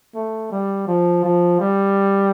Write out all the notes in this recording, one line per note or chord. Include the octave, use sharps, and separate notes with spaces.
A3
G3
F3
F3
G3